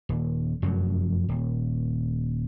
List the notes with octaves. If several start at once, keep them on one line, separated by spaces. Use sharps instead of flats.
D#1
F1 F#2 F3 F#3
D#1